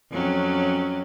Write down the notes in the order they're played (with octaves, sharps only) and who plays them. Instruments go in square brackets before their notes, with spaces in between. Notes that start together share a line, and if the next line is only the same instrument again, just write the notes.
[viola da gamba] F2 F#3 C#4